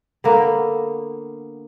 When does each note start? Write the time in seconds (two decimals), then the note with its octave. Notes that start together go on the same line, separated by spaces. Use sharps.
0.24 D3 A#3 B3